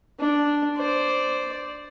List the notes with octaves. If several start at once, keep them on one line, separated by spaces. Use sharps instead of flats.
D4
C5 D5